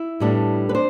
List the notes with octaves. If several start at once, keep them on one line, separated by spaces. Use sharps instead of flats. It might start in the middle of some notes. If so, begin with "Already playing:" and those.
Already playing: E4
A2 G3 B3 D4
B4
D4 C5